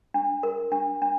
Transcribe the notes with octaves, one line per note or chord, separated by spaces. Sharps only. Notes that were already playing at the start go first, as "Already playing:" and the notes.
D4
A#4
D4
D4